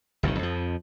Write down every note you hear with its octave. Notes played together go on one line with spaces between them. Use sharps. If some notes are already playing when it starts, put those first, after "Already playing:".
G1 C2 B2 D#3
F2 F3